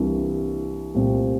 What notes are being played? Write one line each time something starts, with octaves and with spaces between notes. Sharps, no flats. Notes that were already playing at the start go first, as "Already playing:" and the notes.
Already playing: C2 C3 E3 A#3 D4
C2 A#2 A3 C4